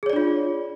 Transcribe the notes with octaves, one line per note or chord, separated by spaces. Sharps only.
D4 F4 G#4 C#5 D5